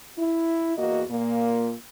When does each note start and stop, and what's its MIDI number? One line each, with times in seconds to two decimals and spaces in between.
0.17 0.76 64
0.77 1.02 40
0.77 1.02 58
0.77 1.02 66
0.77 1.02 75
1.09 1.73 46
1.09 1.73 58